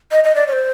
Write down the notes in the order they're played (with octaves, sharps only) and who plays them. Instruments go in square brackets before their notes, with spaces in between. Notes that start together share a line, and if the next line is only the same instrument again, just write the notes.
[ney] D#5
D#5
D5
C#5
C5